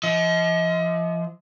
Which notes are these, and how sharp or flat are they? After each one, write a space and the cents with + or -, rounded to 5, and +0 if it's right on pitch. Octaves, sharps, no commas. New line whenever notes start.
F3 -30 D#5 +35